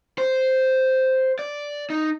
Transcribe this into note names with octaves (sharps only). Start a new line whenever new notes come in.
C5
D5
D#4